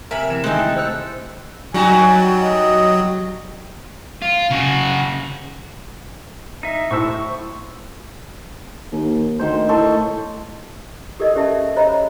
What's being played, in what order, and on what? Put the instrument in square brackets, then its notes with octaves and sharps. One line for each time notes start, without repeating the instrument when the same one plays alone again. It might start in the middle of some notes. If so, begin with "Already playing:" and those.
[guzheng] C3 B5 [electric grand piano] A#4 E5 G#5
[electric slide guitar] E3 C4 [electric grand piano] E7
[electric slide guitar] D#3 [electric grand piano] G#3 G#5 [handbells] A3 F#6 [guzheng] C4 D#4
[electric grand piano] E4 [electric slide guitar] A4
[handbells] C5 E6 F#6
[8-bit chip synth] F#3 [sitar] G3 D#4 F#4 [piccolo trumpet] G#5
[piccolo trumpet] D#5
[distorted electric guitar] F4
C#3 F#4
[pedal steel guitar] D#4 E5
[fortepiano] A2 C5 E6 [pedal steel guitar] C#6
[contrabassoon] D#2
[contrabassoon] D2 [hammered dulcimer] D#3 C5
[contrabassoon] A2 [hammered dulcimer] A4 C6 C#6
[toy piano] G4 A4 A#4 D5 D#5
C#4 G4 D5 E5 A5
C5 C#5 D#5 A#5 B5